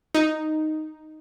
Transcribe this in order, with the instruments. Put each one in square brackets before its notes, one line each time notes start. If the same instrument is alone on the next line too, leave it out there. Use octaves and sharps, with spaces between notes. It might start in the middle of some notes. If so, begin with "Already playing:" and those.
[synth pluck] D#4